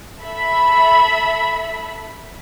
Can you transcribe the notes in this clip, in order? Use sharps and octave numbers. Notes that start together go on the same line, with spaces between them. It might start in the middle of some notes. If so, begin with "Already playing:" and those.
A4 E5 B5